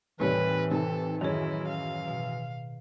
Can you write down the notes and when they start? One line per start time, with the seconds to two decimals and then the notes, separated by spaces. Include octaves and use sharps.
0.20 D#2 A2 C3 E3 G3 B4 C#5
0.71 C3 D#3 G4 A4
1.21 F#2 D#3 E3 C#4 E4 G#4
1.68 F5
2.08 B2